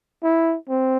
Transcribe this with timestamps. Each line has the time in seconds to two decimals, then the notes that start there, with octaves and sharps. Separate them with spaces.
0.23 E4
0.69 C4